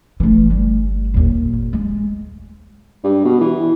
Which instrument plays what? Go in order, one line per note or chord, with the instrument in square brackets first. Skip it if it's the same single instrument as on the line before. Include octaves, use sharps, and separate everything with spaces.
[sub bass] G1 [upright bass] E3 A3
[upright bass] G3
D#2 A#2
G#3
[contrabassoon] G2
B2
E3